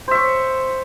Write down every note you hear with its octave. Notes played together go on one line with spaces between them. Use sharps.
C5 E5 C#6